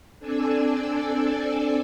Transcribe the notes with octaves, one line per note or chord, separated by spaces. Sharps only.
C4 D4 A4 D5 G#5 E6